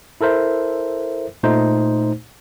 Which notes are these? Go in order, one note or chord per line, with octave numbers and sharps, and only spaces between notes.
E4 A4 A#4 C5 E5
A#2 A3 D#4 C5